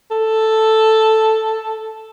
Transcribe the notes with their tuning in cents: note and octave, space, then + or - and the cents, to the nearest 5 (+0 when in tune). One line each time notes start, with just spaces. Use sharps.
A4 +0